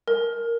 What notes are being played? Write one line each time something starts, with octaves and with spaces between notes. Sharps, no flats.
A#4